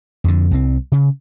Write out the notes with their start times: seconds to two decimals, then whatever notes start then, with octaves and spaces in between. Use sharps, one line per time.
0.24 F2 D3
0.51 C2 F#3 C4
0.92 C#3